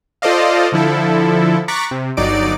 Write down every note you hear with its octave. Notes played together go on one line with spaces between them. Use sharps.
F4 A4 C5 D5 D#5 F5
D3 F3 E4 A4
A#5 C#6 D6 F#6 A6 B6
C3
G1 F#3 D#4 D5 D7